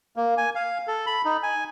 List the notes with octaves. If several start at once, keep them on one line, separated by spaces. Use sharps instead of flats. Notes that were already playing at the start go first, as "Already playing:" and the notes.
A#3
G#5
F5
A4
B5
D#4
G#5